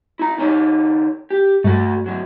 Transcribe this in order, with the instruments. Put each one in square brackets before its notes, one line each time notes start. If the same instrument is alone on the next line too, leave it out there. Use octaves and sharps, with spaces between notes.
[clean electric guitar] E4 A#5
D3 D#4 C#5
G4
[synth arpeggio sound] G2 [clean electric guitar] A3 F#4 A4
[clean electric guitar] D3 F#3